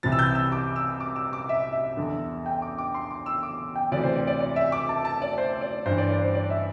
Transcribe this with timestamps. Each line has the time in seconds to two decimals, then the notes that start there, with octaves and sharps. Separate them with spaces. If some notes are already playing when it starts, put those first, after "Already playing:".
0.03 C2 C3 E3 A6
0.12 E6
0.19 G6
0.35 E6
0.52 D6
0.76 E6
1.00 D6
1.16 E6
1.33 D6
1.49 E5
1.72 E5
1.97 E2 D3
2.46 G5
2.62 D6
2.78 D6
2.95 C6
3.10 D6
3.26 E6
3.43 D6
3.75 G5
3.91 D2 C3 E3 D5
4.04 C5
4.16 D5
4.27 D5
4.40 D5
4.56 E5
4.72 D6
4.89 A5
5.05 A5
5.22 D5
5.38 C5
5.61 D5
5.86 G2 E3 C5
5.98 D5
6.10 D5
6.22 C5
6.35 D5
6.50 E5